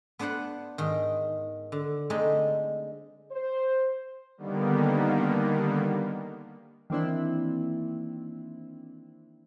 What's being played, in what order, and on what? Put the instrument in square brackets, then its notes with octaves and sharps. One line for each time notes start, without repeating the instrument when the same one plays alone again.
[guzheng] B3 D4 B4 C5 F#5
G#2 D#3
D3
D3 G#3 A3 C4 D#4
[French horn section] C5
[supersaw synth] D3 D#3 G3 A#3 B3
[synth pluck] D#3 E3 A#3 C4 D4 E4